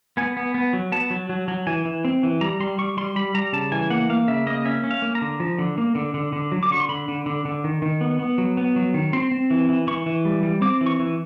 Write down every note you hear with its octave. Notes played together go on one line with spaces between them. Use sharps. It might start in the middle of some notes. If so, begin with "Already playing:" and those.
B3 G#5
B3
B3
F#3
B3 A5
F#3
F#3
F#3
E3 G#5
E3
C4
E3
G3 A#5
G3 C6
G3 C#6
G3 C6
G3 B5
G3 A#5
C#3 A5
E3 G#5
A#3 F#5
A#3 F5
C#3 E5
A#3 D#5
C#4 E5
C#4
F5
A#3
A#5
D3
F3
D3
A#3
D3
D3
D3
F#3
D6
D3 C#6
C6
D3 B5
D3
D3
D3
D#3
D#3
B3
B3
F#3
B3
F#3
D#3
C4 C6
C4
E3
E3
E3 C#6
E3
G3
G3
C4 D6
E3
C#6
E3